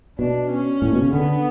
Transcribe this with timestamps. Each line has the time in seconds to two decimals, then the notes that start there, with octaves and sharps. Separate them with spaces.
0.19 B2 D4
0.50 C#4
0.82 A2
0.93 B2
1.02 C#3
1.13 D3 B3